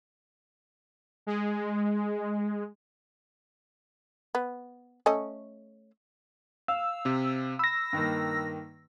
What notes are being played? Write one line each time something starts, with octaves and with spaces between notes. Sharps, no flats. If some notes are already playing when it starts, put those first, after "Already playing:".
G#3
B3
A3 C#4 D#5
F5 E6
C3 C4
B5 E6 A#6
G2 D#3 A#3